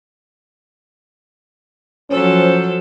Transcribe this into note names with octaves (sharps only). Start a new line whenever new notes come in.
F3 F#3 C#4 A4 C5